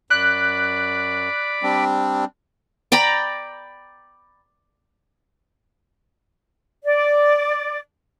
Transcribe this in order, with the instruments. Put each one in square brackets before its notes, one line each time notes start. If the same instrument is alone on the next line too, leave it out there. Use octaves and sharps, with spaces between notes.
[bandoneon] F#2 [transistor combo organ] D5 B5 [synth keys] F#6
[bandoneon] G3 C4 D4
[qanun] D5 G5 A#5 B5
[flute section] D5